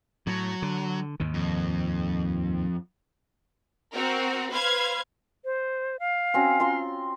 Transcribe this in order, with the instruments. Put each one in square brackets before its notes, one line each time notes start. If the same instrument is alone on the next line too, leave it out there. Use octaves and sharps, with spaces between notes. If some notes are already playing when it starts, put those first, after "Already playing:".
[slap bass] A2 [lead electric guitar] F#3
[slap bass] D3
D#2 G#2 D#3
[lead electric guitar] F2
[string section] C4 F#4 A#4
B4 C5 F5 G#6
[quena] C5
F5
[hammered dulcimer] C4 C#4 F#4
F4 A#5 C6